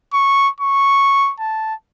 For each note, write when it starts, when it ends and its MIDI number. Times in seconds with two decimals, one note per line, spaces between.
0.13 0.49 85
0.60 1.33 85
1.40 1.74 81